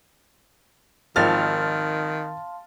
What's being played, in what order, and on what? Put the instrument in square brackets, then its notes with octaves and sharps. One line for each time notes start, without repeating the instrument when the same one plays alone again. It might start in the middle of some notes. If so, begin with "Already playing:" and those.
[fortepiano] G#1 F3 [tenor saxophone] D#3 [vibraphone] F5 A5 C6 [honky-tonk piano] F6 A6